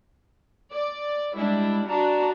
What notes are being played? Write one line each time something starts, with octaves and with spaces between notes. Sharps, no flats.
D5
G3 G#3 D4 E4
D4 F#4 D5 A5 A#5